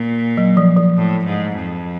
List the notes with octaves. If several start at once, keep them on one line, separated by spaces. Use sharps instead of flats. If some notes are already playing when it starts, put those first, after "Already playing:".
Already playing: A#2
F#3
F3
F3
A2
G#2
F2